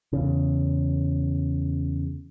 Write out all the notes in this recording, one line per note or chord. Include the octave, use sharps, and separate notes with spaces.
E2 C#3